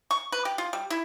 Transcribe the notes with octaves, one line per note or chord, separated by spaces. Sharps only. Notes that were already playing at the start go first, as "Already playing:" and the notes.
C#6
B4
G4
F4
G3
E4